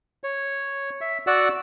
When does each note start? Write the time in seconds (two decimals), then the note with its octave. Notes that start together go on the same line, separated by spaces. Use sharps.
0.24 C#5
1.01 E5
1.27 F#4 D5 F#5 E6